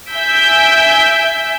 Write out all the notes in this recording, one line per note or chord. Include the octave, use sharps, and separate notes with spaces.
E5 G#5 E6 G6 B6 D7